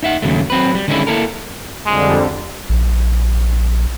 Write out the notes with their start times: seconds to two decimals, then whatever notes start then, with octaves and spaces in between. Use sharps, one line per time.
0.03 D#4 E5 F#5
0.22 D#2 C#3 F#3 A3
0.50 F#3 C4 B4
0.75 G3
0.88 D3 D#3 G3 G#3 C#4 E4
1.07 A#3 E4 A4 A#4
1.86 F2 D3 G3 G#3
2.69 A#1